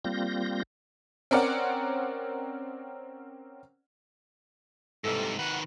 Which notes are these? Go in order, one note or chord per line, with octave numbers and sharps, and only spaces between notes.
G3 A#3 C4 F4 G6 A#6
C4 C#4 A#4 D5 F#5
G#2 C3 E3 G3 A4
D#3 B4 F#5